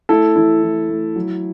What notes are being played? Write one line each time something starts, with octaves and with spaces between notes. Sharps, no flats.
A3 E4 A4
E3 E4
E3
A3
F#3